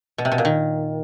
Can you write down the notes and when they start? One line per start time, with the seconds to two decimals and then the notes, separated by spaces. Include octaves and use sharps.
0.18 B2
0.25 C3
0.32 B2
0.38 A#2
0.45 D#3